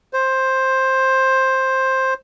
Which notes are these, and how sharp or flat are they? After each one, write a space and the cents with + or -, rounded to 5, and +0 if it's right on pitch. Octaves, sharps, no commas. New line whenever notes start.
C5 +10